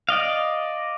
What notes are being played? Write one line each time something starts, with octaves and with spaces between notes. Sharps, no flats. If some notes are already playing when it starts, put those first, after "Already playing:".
D5 D#5 F5